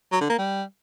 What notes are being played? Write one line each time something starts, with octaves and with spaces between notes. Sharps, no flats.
F#3
D3
A#3
G3